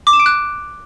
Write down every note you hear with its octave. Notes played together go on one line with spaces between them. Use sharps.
D6
E7
D7
F#6